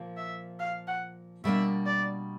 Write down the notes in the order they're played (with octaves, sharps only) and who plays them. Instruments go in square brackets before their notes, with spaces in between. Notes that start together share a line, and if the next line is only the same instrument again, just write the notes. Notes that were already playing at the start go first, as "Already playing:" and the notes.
Already playing: [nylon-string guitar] A#2 F3 A#3
[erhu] E5
F5
F#5
[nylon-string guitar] B2 G3 A#3 D4 [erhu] E5
[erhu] D5